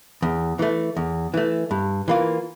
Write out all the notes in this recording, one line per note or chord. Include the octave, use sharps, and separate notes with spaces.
E2
E3 A3
E2
E3 A3
G2
E3 A#3 F4